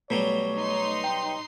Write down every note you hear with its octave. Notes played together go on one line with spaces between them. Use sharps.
B2 F#3 G3 A3 C#5
D#4 C6
G5